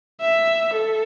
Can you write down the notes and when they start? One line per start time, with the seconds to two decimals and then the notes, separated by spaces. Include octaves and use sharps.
0.21 E5
0.74 A4